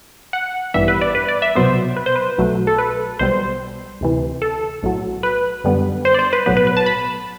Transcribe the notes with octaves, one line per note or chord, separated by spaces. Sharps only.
F#5
A1 G2 E3 G3 B3 E5
B4
D5
B4
D5
E5
C2 B2 F#3 B3 C5
B4
C5
B4
B1 B2 F#3 A3
A4
B4
B1 B2 G3 C5
D2 C3 E3
A4
B1 A2 F#3
B4
F#2 D3 G3 B3
C5
D5
C5
B4
B1 A2 F#3 B3 B4
B4
B4
A5
B5